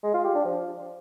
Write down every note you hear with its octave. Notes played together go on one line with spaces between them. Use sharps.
G#3
F4
G4
D4
F3